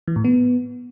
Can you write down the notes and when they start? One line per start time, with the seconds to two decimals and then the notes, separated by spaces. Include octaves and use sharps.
0.08 E3
0.16 A2
0.24 B3